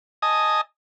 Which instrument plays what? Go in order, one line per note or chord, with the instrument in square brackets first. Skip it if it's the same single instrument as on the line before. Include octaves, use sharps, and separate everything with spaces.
[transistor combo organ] D#5 G#5 A5 D#6